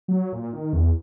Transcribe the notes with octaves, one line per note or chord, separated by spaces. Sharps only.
F#3
A#2
D#3
E2